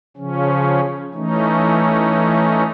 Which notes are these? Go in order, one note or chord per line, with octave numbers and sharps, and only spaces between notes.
C#3 F3 C#4
E3 A3 C#4 D#4